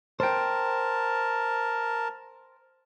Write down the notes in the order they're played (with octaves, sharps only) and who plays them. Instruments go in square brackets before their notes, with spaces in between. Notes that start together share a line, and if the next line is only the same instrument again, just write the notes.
[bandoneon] A#4 A5 [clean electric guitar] C5 G5